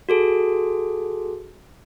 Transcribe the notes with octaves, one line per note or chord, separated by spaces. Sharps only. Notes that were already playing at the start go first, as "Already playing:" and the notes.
F#4 G#4 A4